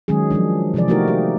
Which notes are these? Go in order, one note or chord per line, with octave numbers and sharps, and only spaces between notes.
D#3 F#3 G#3 C#4 G#4
F3 F#3 G#3 D4
C3 E3 F3 G#4 D5
A3 A#3 D#4 F#4 G4 A#4
G4